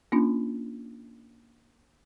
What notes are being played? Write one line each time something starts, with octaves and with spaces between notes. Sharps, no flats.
A#3 C#4 D4 F4